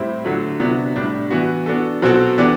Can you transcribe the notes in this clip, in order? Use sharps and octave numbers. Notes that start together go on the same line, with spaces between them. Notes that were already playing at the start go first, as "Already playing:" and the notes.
Already playing: A2 G3 C4 E4
D3 F#3 A3
C3 F#3 B3 D4
A2 G3 D4
E3 B3 F#4
B3 D4 F#4 A4
B2 F#3 C4 F#4 A4
E3 B3 D4 G4 D5